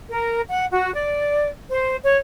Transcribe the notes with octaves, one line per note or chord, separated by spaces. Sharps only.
A#4
F#5
F#4
D5
C5
C#5